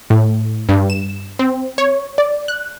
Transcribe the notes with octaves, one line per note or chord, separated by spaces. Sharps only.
A2
G2
E7
C4
C#5
D5
F#6